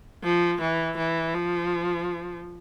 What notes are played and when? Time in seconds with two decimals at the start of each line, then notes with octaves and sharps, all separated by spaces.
0.24 F3
0.61 E3
0.98 E3
1.35 F3